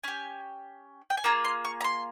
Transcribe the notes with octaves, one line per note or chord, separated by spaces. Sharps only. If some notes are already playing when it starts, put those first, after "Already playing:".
C#4 G4 G#5
G5
G#5
A#3 F4 G#4 A#5
C6
C#6
A#5
C6